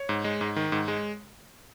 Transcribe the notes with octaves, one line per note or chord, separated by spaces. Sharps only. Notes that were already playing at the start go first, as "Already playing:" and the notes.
Already playing: C#5
G#2
G#3
G#2
D#3
G#2
G#3